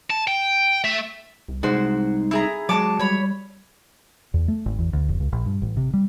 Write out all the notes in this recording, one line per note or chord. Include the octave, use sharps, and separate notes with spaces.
A5
G5
A3 E5
C2
C2 G#3 D#4 F#4 C5
E4 G#4 A#5
F#3 G#3 A5 D6
G3 C#5 B5
E2
A3
G#1
E2
D2
F1
C#2
A#1
G2
A1
C3
G3